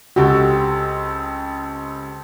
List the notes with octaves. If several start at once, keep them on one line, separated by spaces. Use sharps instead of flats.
C#2 C4 F#4 G4 A4